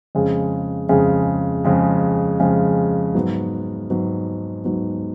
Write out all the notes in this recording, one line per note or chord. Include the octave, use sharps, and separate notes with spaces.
F2 C#3 G#3
F2 C#3 G#3
F2 C#3 G#3
F2 C#3 G#3
G#2 F#3 B3
G#2 F#3 B3
G#2 F#3 B3